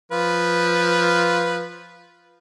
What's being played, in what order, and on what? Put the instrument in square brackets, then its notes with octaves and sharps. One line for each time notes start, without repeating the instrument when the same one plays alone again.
[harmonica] F3 F4 B4